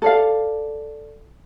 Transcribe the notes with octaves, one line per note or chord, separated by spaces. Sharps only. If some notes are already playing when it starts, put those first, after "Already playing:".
A4 D5 F5